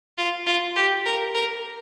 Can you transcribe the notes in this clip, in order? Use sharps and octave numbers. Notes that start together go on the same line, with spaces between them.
F4
F4
G4
A#4
A#4